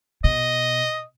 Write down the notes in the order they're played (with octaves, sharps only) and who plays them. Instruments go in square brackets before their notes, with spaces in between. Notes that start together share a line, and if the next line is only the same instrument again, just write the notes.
[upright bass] B2 [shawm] D#5